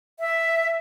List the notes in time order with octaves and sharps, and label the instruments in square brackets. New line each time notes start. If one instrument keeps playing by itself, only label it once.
[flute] E5